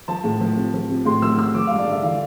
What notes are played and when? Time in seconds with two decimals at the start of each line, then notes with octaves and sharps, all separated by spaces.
0.08 F3 A5
0.24 A2
0.40 F3
0.56 C3
0.74 F3
0.90 C3
1.05 A2 C6
1.22 F3 E6
1.38 A2 E6
1.54 F3 D6
1.67 G2 F5
1.79 D5
1.87 D3 E5
2.03 E3 F5